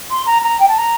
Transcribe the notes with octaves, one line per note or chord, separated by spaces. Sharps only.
C6
A#5
A#5
G5
A5
A#5